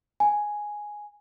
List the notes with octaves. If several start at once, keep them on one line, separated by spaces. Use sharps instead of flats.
G#5